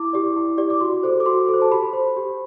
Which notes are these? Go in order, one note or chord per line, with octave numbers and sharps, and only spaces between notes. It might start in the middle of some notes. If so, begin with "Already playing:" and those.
Already playing: E4 D6
G4 D5
E4
G4 D5
D6
F#4 C6
A4 C5
D6
F#4 C6
A4
C5
A5
G4 B5
C5
G4